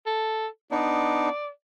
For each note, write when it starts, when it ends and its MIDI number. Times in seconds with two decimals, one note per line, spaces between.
0.06 0.47 69
0.71 1.29 59
0.71 1.29 62
0.71 1.29 63
0.71 1.48 74